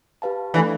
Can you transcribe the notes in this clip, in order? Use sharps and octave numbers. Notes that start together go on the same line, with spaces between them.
G4 B4 F5 A5
E3 A3 D4 A4 D5 F5